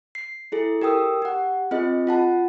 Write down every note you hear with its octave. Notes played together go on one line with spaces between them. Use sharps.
C7
E4 G#4 A4
G4 A#4 G5 D#6 E6
G4 F#5
C4 F4 G#4 D#5
F4 F#5 A5